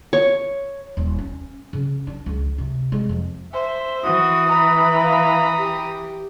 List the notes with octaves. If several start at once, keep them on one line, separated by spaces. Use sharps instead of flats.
C#5
D#1
C#4
C#3
D4
C#2
C3
G#3
F2
C5 E5
E3 F#4 D#6
B4 A#5 B5
F5 D#6
G4